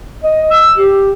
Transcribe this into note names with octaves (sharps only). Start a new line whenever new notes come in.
D#5
E6
G4